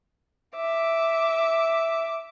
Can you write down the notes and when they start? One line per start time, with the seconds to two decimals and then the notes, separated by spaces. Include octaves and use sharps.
0.56 E5 D6